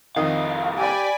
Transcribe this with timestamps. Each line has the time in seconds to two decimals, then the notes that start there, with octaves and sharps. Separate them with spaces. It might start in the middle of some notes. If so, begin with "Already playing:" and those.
0.16 C2 F2 D#3 D#5 F5
0.78 G4 D5 G#5 B5